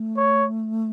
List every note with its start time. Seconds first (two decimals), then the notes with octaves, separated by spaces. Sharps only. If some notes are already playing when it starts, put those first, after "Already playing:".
Already playing: A3
0.17 C#5